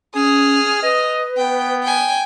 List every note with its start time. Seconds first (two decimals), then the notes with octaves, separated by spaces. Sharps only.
0.15 C#4 G#4 D#6 F6
0.83 B4 D#5
1.38 B3 G5
1.83 G5 G#5